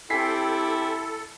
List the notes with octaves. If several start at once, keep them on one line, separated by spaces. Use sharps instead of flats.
C4 E4 G4 A4 G#5 B6 C7